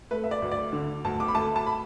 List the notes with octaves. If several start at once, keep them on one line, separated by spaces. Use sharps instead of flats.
A3 B4
E5
D5
D2
D5
D3
D2 A5
D6
B5
A3 A5
A5
B5